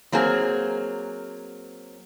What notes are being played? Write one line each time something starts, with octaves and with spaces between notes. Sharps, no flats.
F#3 A#3 C4 G#4